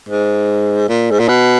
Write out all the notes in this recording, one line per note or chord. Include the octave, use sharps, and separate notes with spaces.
G#2
A#2
G#2
A#2
B2